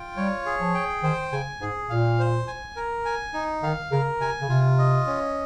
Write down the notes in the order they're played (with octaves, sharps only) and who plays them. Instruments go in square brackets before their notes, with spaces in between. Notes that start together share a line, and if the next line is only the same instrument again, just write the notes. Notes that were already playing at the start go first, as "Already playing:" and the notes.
Already playing: [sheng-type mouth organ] F4 G5
[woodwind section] G3 [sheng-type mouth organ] C#5
[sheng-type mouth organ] G#4
[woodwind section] F3
[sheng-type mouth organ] G5
[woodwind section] D#3 [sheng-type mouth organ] C5
[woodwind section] C#3 [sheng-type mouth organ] G#5
[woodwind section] G#2 [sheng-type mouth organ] G#4
[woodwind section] A#2 [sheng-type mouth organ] F5
[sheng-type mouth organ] C5
G#5
A#4
G#5
D#4
[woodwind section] D#3 [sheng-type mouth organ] F5
[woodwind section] C#3 [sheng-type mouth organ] A#4
[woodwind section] C3 [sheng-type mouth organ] G#5
[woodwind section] C#3
[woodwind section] C3 [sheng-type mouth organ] F4
[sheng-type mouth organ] D#5
C#4